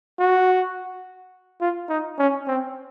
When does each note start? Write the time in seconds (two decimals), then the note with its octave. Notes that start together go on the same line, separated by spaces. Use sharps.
0.19 F#4
1.61 F4
1.89 D#4
2.19 C#4
2.47 C4